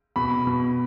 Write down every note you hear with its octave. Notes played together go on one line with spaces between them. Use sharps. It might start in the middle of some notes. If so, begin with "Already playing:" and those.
B2 B5
B2